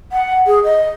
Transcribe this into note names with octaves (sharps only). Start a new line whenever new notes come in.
F#5
G#4
D#5